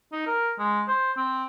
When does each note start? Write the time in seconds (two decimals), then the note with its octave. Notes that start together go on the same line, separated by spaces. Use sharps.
0.12 D#4
0.27 A#4
0.59 G#3
0.88 C5
1.17 C4